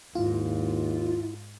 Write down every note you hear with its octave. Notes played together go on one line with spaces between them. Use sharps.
D#2 G#2 E4 F4